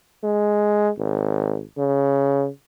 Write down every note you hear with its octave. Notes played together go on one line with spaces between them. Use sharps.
G#3
G#1
C#3